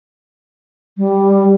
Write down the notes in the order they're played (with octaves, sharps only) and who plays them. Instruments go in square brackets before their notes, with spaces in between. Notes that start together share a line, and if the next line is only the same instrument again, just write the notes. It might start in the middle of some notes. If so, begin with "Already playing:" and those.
[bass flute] G3